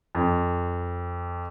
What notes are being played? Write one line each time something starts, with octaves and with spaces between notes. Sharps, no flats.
F2